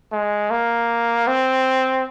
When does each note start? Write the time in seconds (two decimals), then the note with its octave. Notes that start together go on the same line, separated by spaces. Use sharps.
0.13 G#3
0.51 A#3
1.28 C4